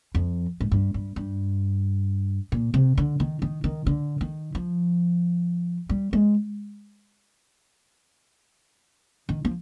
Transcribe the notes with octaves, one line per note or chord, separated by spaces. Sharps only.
F2
G#2
G2
G2
G2
A#2
C3
D3
D#3
D#3
D#3
D3
D#3
F3
G3
G#3
D#3
F3